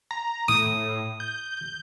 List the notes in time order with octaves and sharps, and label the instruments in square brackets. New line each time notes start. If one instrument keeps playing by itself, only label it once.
[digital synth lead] A#5
[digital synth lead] A2 [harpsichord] D#6
[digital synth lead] G6